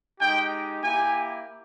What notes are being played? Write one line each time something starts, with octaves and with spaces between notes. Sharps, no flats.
G#3 D#4 G4 G5
A#3 E4 G4 G#5